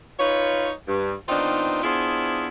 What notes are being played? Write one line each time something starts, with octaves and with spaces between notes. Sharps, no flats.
D#4 F4 B4 C#5
G2
D#3 B3 C4 D4 D#4 F4
B3 D4 E4 F4 G#4 C5